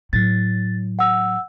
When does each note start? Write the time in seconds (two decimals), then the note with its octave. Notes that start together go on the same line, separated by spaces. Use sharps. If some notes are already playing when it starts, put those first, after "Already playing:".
0.13 A2 F#3 A6
0.99 F#5 E6